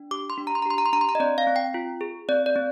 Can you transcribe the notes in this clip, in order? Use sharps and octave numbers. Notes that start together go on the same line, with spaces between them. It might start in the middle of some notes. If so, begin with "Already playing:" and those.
Already playing: D4
G4 D6
C6
D4
A#5
C6
A#5
G4 C6
A#5
C6
D4 A#5
C6
A#5
D#5
C4 D5
F5
C4
G5
F4
G#4
C4 D5
D5
C4